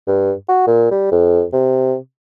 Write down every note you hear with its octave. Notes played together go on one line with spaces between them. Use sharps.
G2
F#4
A#2
G3
F2
C3